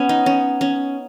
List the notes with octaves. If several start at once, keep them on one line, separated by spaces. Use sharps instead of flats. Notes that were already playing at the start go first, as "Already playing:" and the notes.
Already playing: B3 C#4
D#4
C#4
C#4